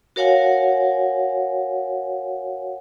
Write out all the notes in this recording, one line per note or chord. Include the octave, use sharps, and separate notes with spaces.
F#4 A#4 C#5 F5 F#5 G#5